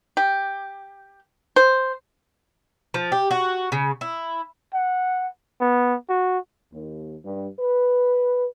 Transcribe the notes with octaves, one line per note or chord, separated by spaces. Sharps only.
G4
C5
F3
G4
F#4
C#3
E4
F#5
B3
F#4
D#2
G2
B4